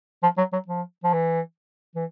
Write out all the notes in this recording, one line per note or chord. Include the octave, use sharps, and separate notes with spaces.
F3
F#3
F#3
F3
F3
E3
E3